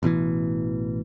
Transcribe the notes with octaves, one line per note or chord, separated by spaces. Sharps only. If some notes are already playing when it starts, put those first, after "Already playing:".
A1 B2 D#3 E3